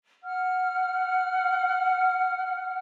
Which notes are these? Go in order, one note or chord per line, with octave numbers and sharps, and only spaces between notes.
F#5 F6